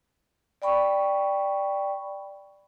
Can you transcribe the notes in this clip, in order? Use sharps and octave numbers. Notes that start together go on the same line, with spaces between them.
D5 G5 B5 C#6